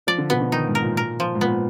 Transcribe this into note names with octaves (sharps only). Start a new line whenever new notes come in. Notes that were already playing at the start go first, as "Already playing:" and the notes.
F3 D5
D3
B2 B3
D3
D#3 D#4
G#2
A#4
A#2
A#4
F3
G#2
A#2 B3